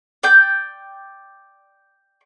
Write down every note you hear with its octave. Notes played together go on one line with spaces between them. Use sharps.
D5 G5 G6